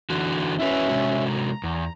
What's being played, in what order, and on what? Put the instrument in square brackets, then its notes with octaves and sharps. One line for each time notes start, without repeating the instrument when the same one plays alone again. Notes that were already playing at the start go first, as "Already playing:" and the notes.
[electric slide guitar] D3 E3 F#4
[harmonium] C#4 E5 [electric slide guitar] E4 F#4 B4
[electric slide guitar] C3 G#3 F#4
[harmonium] A#5
[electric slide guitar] E2